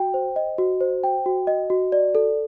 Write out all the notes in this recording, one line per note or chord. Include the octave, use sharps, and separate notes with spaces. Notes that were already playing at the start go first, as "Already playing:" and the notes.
Already playing: F#4 G5
C5
D#5
F#4
C5
G5
F#4
D#5
F#4
D5
A4